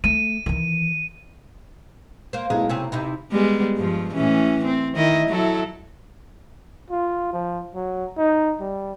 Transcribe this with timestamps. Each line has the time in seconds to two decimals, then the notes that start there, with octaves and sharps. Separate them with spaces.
0.04 A3 D#7
0.46 D#3 E3
2.33 A#3 C5
2.50 B1 A2 G#3
2.69 C3 C4 C#4
2.92 C3 D#4 E4
3.32 G3 G#3 B3
3.77 G2 F3
4.13 A2 E3 C#4
4.65 C4
4.96 D#3 E4 D#5
5.28 F#3 E4 A4
6.91 F4
7.33 F3
7.75 F#3
8.17 D#4
8.60 G3